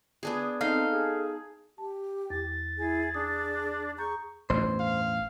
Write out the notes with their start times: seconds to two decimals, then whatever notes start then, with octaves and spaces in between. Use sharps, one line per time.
0.23 B3 D4 G#4
0.61 C4 D#4 A4 F5
0.91 G#4
1.78 G4 A5
2.30 E2 A6
2.78 E4 G#4
3.14 D4 G#4 D#6
3.98 G#4 A#5 C#6 G6
4.50 A1 E2 G2 C5
4.80 F5